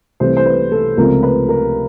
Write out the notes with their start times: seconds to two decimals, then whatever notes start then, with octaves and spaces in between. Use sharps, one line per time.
0.20 C2 C3 E3 A3 C5
0.37 C5
0.46 B4
0.72 A4
0.97 C#2 C3 F3 A3 C4 A#4
1.23 B4
1.49 A#4